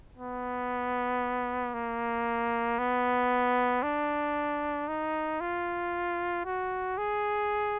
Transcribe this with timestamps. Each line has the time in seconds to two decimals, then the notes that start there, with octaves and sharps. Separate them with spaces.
0.18 B3
1.74 A#3
2.79 B3
3.83 D4
4.88 D#4
5.41 F4
6.45 F#4
6.98 G#4